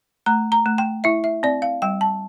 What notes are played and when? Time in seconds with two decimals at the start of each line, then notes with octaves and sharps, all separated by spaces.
0.26 A3 A#5
0.52 A#5
0.66 A3
0.78 G5
1.04 E4 E5
1.24 E5
1.43 C4 D5
1.62 F5
1.82 G3 G5
2.01 A5